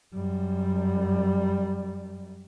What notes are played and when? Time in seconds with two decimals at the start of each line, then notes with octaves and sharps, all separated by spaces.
0.14 F#2 G3